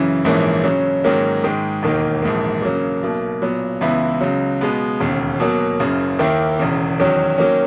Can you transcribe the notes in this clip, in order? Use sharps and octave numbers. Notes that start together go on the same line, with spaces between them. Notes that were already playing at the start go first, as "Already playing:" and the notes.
Already playing: F#2 C#3 E3
A#1 G#2 E3 A#3 C#4
C#3 F#3 C#4
G#2 D#3 F#3 A#3 C#4
G#2 D#3 G#3
E1 D#2 D#3 A#3 D#4
A#1 G#2 E3 A#3
C#3 F#3 A#3
B1 B2 A#3
A#2 F#3 B3
C#2 C#3 E3 B3 E4
C#2 C#3 F#3
B2 G#3 B3
E1 D#2 C#3
B2 F#3 A#3
F#1 F#2 C#3
D#2 D#3 A#3 E4
E1 E2 C#3
E2 D#3 F#3 C#4
D#3 F#3 A#3 C#4